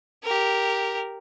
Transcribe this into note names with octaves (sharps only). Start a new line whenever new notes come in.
G4 A#4